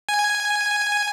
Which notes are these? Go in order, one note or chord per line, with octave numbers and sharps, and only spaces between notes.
G#5